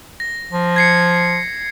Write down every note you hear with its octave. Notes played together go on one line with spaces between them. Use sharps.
A#6
F3
G#6 C7 C#7